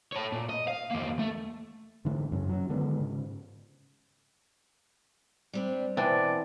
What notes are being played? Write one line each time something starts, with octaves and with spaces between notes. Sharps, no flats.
A4 C#5
A#2
D#5
F5
E2 A#3
A3
G#2 D3 E3 A3
F#2 C#3 C4 C#4
F#3 C#4
D3 D#3 G#3 B3
G#2 C#3
G3 C4 D4
B2 E3 C4 D4 C5 D5